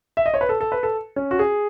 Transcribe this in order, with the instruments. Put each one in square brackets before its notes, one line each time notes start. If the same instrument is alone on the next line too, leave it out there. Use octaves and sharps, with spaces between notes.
[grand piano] E5
D#5
C#5
B4
A4
A4
B4
A4
C#4
F#4
G#4